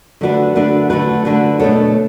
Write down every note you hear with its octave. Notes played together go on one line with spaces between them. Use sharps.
D3 A3 D4 F#4 B4
D3 A3 D4 F#4 B4
D3 A3 D4 F#4 B4
D3 A3 D4 F#4 B4
B2 A3 D4 A4 C#5